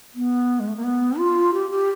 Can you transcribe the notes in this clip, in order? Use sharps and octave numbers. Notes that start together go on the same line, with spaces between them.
B3
G#3
A3
A#3
B3
F4
G4
G4